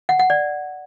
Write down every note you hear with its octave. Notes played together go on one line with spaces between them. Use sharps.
F#5
F#5
D5